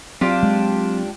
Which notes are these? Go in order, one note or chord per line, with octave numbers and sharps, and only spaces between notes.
F#3 C4 D4 F4 G4
G#3